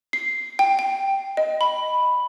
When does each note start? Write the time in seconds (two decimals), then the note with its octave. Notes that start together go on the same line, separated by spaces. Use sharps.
0.13 C7
0.59 G5
0.79 G5
1.37 D#5
1.61 B5